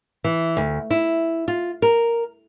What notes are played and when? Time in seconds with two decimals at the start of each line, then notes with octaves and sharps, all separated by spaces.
0.24 E3
0.57 D2
0.91 E4
1.48 F4
1.82 A#4